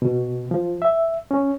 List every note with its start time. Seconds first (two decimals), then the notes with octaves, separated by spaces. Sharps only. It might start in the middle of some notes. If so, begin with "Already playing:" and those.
0.02 B2
0.51 F3
0.82 E5
1.31 C#4